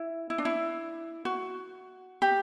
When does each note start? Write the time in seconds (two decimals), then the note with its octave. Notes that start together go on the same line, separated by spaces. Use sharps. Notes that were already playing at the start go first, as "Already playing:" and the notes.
Already playing: E4
0.30 E4
0.38 D4
0.45 E4
1.25 F#4
2.22 G4